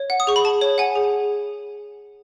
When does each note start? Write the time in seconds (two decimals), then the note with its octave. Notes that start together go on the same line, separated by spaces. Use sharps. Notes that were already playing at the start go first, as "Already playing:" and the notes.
Already playing: C#5
0.10 F#5
0.20 D#6
0.27 G#4 C#6
0.36 B5
0.44 G#4 A5
0.61 C#5
0.78 F#5 G#5
0.95 G#4